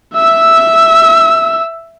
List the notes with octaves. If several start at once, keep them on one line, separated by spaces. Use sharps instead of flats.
E5 E6